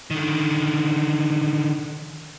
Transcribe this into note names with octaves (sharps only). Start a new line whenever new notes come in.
D3 D#3